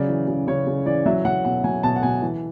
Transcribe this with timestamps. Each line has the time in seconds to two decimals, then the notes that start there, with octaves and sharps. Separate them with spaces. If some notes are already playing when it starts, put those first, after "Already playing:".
Already playing: C#3 F#3 D5
0.08 E3
0.28 C#3
0.47 C#3 C#5
0.67 C#3
0.86 E3 D5
1.06 F#3 E5
1.25 F#3 F#5
1.45 B2 F#5
1.64 F#3 G#5
1.83 B2 A5
1.96 F#5
2.03 B2 G#5
2.22 E3